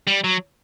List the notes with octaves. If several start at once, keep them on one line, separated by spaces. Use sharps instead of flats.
G3
F#3